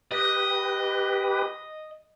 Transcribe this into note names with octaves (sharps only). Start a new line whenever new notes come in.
G4 B4 D#5